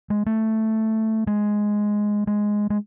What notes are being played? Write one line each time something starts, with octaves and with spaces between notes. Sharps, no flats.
G#3
A3
G#3
G#3
G#3